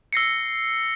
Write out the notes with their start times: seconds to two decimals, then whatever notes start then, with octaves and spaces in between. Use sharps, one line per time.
0.13 E6 A#6 C7 C#7